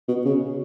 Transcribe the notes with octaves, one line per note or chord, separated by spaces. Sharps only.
B2
C#3